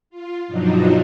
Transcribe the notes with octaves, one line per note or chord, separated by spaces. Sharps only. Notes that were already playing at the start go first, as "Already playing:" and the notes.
F4
G2 B2 F3 F#3 D4 D#4